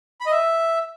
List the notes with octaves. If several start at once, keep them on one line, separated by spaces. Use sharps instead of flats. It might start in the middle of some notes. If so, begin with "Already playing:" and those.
B5
D#5
E5